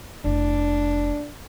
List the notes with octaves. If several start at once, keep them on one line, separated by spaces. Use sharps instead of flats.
F1 D4 E4